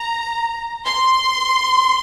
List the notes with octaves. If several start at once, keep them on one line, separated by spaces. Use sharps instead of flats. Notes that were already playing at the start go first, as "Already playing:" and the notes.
Already playing: A#5
C6